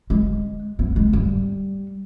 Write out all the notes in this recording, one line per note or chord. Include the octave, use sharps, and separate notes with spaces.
G#3
B3
G#3
G3